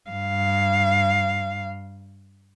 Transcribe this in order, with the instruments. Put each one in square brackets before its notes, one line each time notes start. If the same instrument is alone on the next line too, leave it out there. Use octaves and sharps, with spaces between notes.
[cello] G2 F5